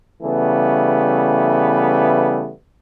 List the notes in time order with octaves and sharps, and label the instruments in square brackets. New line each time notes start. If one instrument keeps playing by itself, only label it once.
[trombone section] C#3 E3 G3 A3 B3